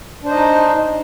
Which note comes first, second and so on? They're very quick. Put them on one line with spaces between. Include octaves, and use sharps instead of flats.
D4 C5 D#5 D#4